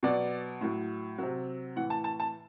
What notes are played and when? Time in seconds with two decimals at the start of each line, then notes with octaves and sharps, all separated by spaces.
0.03 B2 F#3 D5
0.61 A2 F#3
1.18 C3 F#3
1.76 A2 E3 F#5
1.90 A5
2.04 A5
2.20 A5